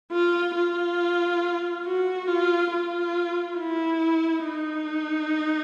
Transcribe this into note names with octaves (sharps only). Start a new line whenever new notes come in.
F4
F4
F#4
F4
F4
E4
D#4